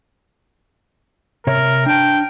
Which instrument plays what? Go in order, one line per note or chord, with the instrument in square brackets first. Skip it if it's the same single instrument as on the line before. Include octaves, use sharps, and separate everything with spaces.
[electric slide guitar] C3 C#5 E5 [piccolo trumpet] A#4
[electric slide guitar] D4 A5 [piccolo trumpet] G5